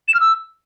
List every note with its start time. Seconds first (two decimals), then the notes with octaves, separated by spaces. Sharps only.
0.08 E7
0.14 F6
0.20 E6